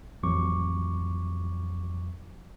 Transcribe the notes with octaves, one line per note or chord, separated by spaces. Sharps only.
A1 F2 F#3 C#6 D6